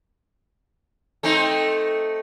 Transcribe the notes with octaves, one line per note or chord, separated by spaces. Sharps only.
A3 C4 D#4